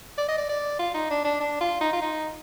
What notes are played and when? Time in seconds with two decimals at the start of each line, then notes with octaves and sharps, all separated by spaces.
0.18 D5
0.28 D#5
0.38 D5
0.49 D5
0.79 F4
0.94 D#4
1.10 D4
1.25 D4
1.40 D4
1.61 F4
1.81 D#4
1.93 F4
2.02 D#4